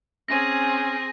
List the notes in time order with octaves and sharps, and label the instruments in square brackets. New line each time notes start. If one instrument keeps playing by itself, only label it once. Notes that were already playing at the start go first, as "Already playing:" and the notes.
[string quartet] C4 G#4 G#5 [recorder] C#4 [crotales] A#6 D#7